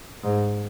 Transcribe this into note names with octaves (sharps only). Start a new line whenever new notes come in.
G#2